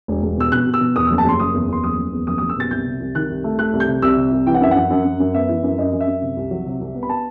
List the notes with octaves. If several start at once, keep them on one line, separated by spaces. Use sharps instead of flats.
E1
E1
B2 E6
B2 F#6
B2
E6
B2
E2 D#6
F#1 E6
A5
F#1 C6
F#1 D#6
E2
E2 C6
F#1 D#6
F#1
E2
F#1 D#6
F#1 D#6
E6
B2 A6
C2 G6
C3
C2
D#3 F#6
C2
A3
A3 F#6
C2
G6
C3
C2 E6
C3
C2
E3 G5
F#5
F#2 E5
F#2 F#5
F#2
F#2
F#2
B3 E5
E3
F#2
F#2 D#5
F#2
E5
F#2
C3
C2
F#3
C3
C2
B3
B5
A5